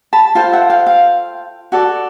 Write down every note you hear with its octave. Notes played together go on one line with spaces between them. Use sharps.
A5 B5
F4 A4 C5 F5 G5
E5 F#5
F5 G5
F5 G5
F#4 A4 D5